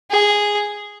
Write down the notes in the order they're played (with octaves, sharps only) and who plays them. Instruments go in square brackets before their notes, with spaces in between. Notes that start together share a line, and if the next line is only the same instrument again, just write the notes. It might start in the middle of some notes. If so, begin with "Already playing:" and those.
[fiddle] G#4